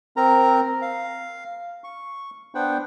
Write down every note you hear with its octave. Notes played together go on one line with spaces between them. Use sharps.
C4 A#4 A#5
F5
C#6
B3 D4 C5 F#5 G5